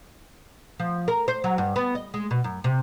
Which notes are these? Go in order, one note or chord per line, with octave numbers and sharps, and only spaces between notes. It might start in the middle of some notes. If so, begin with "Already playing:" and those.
F3
A#4
C5
F#3
G2
B3
D#5
G#3
B2
F#2
C3